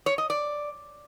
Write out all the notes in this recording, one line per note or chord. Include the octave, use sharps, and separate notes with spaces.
C#5
D#5
D5